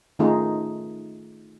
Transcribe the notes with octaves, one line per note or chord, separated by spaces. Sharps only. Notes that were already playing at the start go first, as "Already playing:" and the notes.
D#3 A3 C#4 D#4 F4 G#4